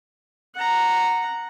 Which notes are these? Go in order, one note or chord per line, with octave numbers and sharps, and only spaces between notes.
F#5 A#5